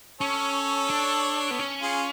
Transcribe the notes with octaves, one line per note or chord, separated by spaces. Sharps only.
C#4 A4 C#5
D4
B3
C#4
F4 G#4